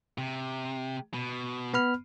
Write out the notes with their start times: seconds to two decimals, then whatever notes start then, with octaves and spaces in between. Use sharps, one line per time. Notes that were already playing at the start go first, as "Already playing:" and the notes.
0.18 C3
1.14 B2
1.74 B3 B5 F6